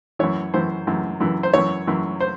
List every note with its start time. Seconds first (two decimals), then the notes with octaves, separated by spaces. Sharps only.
0.19 F#2 E3 C#5
0.54 F#2 E3 C5
0.87 F#2 E3
1.20 F#2 E3
1.43 C5
1.54 F#2 E3 C#5
1.87 F#2 E3
2.20 C5